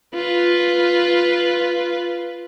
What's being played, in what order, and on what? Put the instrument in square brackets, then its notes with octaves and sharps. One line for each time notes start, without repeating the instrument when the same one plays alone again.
[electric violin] F4 B4